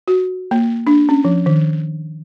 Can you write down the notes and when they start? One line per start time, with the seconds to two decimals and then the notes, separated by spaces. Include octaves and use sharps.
0.08 F#4
0.51 A#3
0.87 D4
1.09 C#4
1.25 F3
1.46 D#3